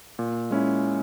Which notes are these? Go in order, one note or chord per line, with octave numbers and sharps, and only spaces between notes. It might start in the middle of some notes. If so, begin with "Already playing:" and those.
A#2
G#3 C#4 E4